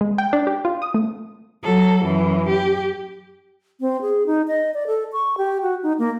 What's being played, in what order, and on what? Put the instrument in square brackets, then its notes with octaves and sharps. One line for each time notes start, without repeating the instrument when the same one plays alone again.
[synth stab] G#3
G5
D4
G4
F4
D#6
A3
[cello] F#3 A4
F#2 E3
G4
[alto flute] C4
G#4
D#4
D#5
D5
A4
C#6
G4
F#4
D#4
A#3